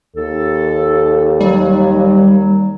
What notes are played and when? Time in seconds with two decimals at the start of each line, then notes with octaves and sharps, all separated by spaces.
0.16 D#2 A4
1.40 F#3 G3